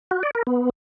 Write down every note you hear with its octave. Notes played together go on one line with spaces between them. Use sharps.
F#4
D5
A#4
B3